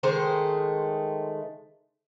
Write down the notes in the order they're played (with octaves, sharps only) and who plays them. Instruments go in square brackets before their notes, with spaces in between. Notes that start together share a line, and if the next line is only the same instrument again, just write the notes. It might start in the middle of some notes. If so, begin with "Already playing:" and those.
[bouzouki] D#3 G#3 A3 C5